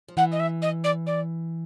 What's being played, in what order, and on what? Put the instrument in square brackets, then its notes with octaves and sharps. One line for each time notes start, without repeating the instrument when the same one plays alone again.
[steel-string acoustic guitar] F3
[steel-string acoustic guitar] E3 [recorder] F#5
[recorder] D#5
E5
D#5
D5
D5